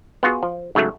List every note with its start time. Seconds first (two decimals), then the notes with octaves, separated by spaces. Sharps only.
0.23 B3 F4 F#4 G#4
0.43 F3
0.75 G#2 C#3 F#3 A3